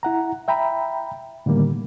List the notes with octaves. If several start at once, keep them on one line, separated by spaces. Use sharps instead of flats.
E4 F#5 A#5
E5 G5 A#5 B5
A2 D3 D#3 G3 A#3